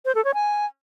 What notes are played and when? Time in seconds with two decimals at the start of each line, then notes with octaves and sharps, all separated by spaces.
0.05 C5
0.15 A4
0.25 C#5
0.34 G#5